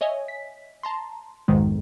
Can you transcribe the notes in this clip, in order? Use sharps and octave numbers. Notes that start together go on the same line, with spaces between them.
C#5 D#5 E5 G#5
B6
A5 A#5 C6
B1 F2 G#2 D#3 G#3